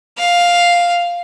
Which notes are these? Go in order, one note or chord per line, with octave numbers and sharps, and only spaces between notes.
F5